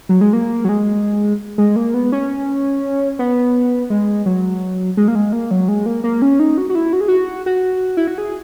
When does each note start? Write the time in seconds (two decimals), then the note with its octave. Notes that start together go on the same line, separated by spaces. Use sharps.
0.09 F#3
0.21 G#3
0.33 A#3
0.65 F#3
0.69 G#3
1.58 G#3
1.76 A#3
1.94 B3
2.12 C#4
3.19 B3
3.90 G#3
4.26 F#3
4.97 G#3
5.08 A#3
5.15 G#3
5.33 A#3
5.51 F#3
5.68 G#3
5.86 A#3
6.04 A#3
6.22 C#4
6.39 D#4
6.58 F#4
6.70 F#4
6.75 E4
6.93 F#4
7.01 G#4
7.08 F#4
7.46 F#4
7.97 E4
8.07 F#4
8.18 G#4